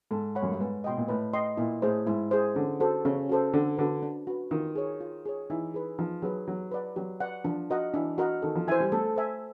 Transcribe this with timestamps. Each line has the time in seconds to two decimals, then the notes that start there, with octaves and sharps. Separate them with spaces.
0.11 G#2 A4
0.35 C#5 F#5 B5
0.43 F#2
0.52 G2
0.60 G#2 B4
0.84 B2 D#5 G5 C6
0.97 A#2
1.08 A2 B4
1.33 D#5 G5 C6
1.57 A#2 E4
1.82 A2 G#4 C5
2.07 G#2 E4
2.31 G#4 C5
2.55 D3 C#4
2.80 F#4 A4 C5
3.05 C#3 C#4
3.29 F#4 A4 C5
3.53 D3 D4
3.78 D3 F#4 B4
4.03 D4
4.27 F#4 B4
4.51 D#3 F4
4.76 G#4 C#5
5.01 F4
5.25 G#4 C#5
5.50 E3 D#4
5.74 G#4 B4
5.98 F3 D#4
6.22 F#3 G#4 B4
6.47 F#3 G4
6.71 B4 D5 F#5
6.96 F#3 G4
7.20 B4 D5 F#5
7.45 F3 D4
7.70 F#4 A#4 D#5 F#5
7.94 E3 D4
8.18 F#4 A#4 D#5 F#5
8.42 D#3 A4
8.55 F3
8.67 E3 C5 E5 G#5
8.80 G3
8.92 A3 A4
9.16 C5 E5 G#5